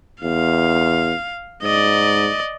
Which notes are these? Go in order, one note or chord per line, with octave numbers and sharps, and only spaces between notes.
E2 F5
G#2 D5 D#5